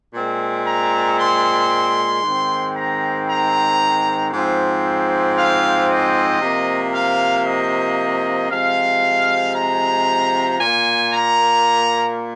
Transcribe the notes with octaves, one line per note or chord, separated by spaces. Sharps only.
A#2 G#3 C4
A#5
C6
G#2 D#3 C4
A#5
A#5
G#2 F3 C4
F5
D#5
C3 F3 A#3
F5
D#5
C3 F3 G#3 F5
A#5
A#2 A#3 G#5
A#5